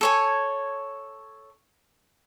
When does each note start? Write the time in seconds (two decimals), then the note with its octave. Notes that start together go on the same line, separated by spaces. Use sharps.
0.01 A4 C#5 G#5